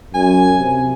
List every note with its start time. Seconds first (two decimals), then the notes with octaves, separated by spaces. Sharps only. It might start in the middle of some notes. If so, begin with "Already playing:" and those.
0.14 F#2 G#5
0.59 C3